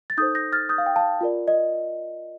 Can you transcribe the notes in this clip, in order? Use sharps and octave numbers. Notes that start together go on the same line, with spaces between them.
A6
D#4 A4 C5 D#6 G6
G6 A#6
F6 A6
D#6 G6
F5
G5
F5 A5
F4 A#4 D5
D#5